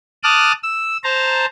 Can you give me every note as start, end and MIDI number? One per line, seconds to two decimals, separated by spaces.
0.23 0.52 81
0.23 0.52 86
0.23 0.52 87
0.23 0.52 89
0.23 0.52 90
0.63 0.97 88
1.04 1.46 72
1.04 1.46 81
1.04 1.46 82